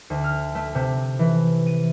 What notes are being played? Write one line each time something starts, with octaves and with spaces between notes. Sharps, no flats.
D2
F6
A3
C3
E3
D#7